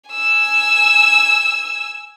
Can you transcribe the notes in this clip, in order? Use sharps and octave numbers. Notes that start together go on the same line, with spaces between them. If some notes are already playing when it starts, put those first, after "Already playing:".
G#5 E6